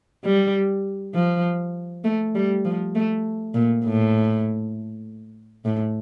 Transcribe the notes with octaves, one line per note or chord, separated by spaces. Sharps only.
G3
F3
A3
G3
F3
A3
A#2
A2
A2